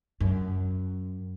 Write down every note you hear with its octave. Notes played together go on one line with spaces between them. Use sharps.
F#2